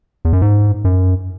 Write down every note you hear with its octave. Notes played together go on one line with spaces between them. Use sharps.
E2
F#2
G#2
F#2